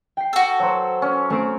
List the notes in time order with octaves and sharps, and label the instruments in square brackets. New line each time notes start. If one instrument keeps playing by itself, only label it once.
[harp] G5 C7
[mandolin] F#4 A4
[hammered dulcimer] F#3 C5
C#4
[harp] A3 C4 D7 [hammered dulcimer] C#4